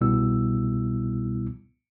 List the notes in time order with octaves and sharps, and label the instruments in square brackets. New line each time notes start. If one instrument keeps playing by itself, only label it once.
[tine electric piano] C2 B2 G3 B3 E4 E6